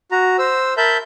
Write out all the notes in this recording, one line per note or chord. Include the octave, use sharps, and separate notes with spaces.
F#4 A#5
C5 E6
A#4 E5 A5 B5 G6